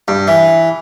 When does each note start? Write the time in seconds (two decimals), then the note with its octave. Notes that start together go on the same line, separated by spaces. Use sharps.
0.08 G2
0.27 E3